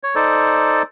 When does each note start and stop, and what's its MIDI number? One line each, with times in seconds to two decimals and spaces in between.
0.03 0.15 73
0.15 0.82 63
0.15 0.82 69
0.15 0.82 72
0.15 0.82 74